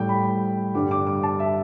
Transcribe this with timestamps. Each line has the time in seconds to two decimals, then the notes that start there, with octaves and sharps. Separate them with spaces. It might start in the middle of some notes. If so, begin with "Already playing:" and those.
Already playing: A2 G3 G5
0.09 B5
0.75 G2 D3 G3 D6
0.91 D6
1.07 D6
1.23 A5
1.40 E5